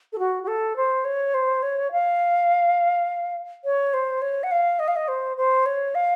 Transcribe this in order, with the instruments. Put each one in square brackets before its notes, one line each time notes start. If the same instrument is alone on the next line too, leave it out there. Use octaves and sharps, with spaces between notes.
[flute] A4
F#4
F#4
A4
C5
C#5
C5
C#5
F5
C#5
C5
C#5
F#5
F5
D#5
F5
D#5
C5
C5
C#5
F5